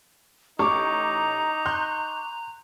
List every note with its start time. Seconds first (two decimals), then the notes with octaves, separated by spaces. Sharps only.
0.59 A1 D#4 A#5 C#6 D6
1.66 C6 F#6 G6